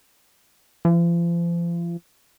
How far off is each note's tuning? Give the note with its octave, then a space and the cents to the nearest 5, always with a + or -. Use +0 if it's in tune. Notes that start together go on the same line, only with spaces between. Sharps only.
F3 -40